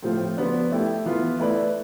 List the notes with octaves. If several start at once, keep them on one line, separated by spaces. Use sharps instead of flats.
A2 F3 C4 F4
F3 B3 D4
A3 E4 G4
E3 B3 F4
A3 E4 B4 D5